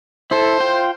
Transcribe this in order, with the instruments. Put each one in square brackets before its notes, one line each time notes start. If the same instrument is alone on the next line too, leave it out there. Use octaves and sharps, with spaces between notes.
[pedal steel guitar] E4 A4 [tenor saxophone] C5
[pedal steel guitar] F4 G5